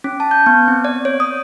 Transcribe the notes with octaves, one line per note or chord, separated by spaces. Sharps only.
C#4
A5
G6
B3
C4
D5
C#5
D#6